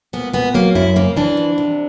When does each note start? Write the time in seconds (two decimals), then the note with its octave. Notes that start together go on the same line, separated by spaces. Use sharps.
0.13 A#2 B3
0.33 A#2 B3
0.54 F#3 A#3
0.75 F#2 E4
0.96 C#3 A#3
1.17 E3 D4
1.37 F2
1.58 C3